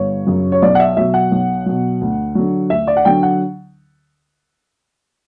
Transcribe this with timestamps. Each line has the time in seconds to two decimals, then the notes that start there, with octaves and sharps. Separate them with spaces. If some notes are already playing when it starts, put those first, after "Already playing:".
Already playing: G1 C#5
0.27 F#2 C#3 F#3
0.52 C#5
0.62 B1 D5
0.75 F#5
0.80 E5
0.97 B2 F#3 E5
1.14 F#5
1.32 B1
1.66 B2 F#3
2.01 D2
2.35 D3 F#3
2.70 D2 E5
2.87 D5
2.97 F#5
3.05 D3 F#3 G5
3.23 F#5